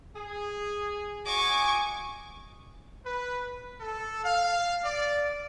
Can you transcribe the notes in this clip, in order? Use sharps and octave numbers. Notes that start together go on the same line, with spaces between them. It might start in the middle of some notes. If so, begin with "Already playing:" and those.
G#4
F#4 D#5 G#5 C#6 D6
B4
A4
F5
D5